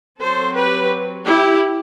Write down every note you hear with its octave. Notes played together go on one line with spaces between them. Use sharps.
F#3 C4 A4 C5
G4 B4
E4 G4